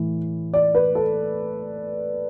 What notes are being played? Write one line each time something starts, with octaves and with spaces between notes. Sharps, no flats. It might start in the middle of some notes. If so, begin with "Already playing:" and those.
Already playing: A2 E3
D5
B4
A4